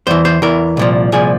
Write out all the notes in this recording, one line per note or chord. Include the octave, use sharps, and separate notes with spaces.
E2 E3 C5
C5
E2 E3 A#4
C2 A#2 F3
C2 A#2 F3 G#4